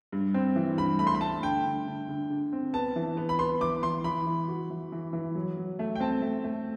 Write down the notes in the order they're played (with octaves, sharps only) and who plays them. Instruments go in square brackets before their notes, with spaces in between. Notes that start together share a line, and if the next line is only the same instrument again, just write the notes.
[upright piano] G2
C4
E3
[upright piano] G2 [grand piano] B5
[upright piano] A3 [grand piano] B5
[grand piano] C6
B5
[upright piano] A3 [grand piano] A5
[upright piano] D3 [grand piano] G5
[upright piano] D3
D3
D3
D3
C4
[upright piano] B3 [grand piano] A5
[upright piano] E3
B3
[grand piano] B5
[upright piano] B3 [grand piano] C6
[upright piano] E3 [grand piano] D6
[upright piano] E3 [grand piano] C6
[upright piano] E3 [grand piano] B5
[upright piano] E3
F#4
E3
E3
E3
F#3
F#3
A3
[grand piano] G5
[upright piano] C4 [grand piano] A5
[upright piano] A3
A3